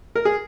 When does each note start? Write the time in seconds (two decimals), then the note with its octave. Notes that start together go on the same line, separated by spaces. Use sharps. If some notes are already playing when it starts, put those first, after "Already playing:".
0.15 A#4
0.25 G#4